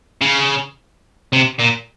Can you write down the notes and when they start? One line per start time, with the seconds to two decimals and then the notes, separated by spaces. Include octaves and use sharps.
0.22 C#3
1.33 C3
1.59 A#2